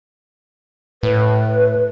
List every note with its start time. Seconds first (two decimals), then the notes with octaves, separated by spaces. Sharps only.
1.03 A2 B4